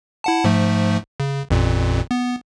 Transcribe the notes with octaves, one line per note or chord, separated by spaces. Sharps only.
E4 F#5 A5
G#2 F3 A3
C#3
A1 F2 A#2
B3